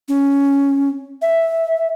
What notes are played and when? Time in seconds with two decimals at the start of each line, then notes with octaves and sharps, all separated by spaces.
0.08 C#4
1.22 E5